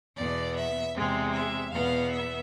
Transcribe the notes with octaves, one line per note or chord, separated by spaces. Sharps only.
E2 B2 B3 D5
E5
E2 C3 G#3 C4
E5
E2 B2 B3 F5
E5